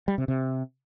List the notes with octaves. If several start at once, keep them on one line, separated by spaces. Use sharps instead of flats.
G3
C3
C3